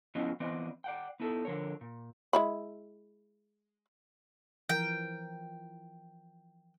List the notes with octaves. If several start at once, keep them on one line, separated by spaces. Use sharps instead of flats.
F3 B3 C#4 E4 F4 D#5
E3 B3 C4 D5 D#5
D5 F#5 G5
B3 D#4 E4 A4
D3 F3 A#4 C#5
A#2
G#3 E4 B5
E3 F3 A#4 G5